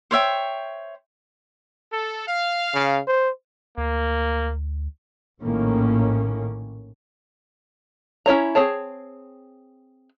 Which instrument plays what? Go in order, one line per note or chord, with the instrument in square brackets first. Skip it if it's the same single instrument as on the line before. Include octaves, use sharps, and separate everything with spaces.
[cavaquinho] C5 C#5 E5 G5
[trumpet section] A4
F5
[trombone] C#3
C5
[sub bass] D2 [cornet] A#3
[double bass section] A#1 A2 D#3 A#3 C#4
[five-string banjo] C#4 E4 C#5 A#5
C4 G#4 C#5 A5